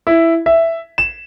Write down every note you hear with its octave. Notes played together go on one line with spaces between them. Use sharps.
E4
E5
E7